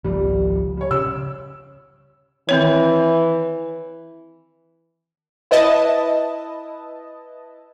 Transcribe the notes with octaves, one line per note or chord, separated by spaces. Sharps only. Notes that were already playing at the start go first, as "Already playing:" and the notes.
G#1 C#2 F3 G3
G3 C#5
C#3 E6
D#3 E3 C4 C#5
E4 B4 D#5 A5